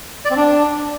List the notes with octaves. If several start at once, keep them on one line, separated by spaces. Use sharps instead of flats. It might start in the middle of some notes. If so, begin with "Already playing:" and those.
D5
C4
D4